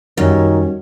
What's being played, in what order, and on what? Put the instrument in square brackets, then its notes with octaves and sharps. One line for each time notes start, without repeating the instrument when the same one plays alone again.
[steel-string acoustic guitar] F#2 [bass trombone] D#3 [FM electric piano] G3 F#4 [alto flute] C#4